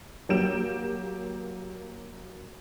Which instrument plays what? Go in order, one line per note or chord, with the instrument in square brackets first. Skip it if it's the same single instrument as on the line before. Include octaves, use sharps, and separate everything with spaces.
[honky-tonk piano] F#3 A#3 G4 G6 D7 E7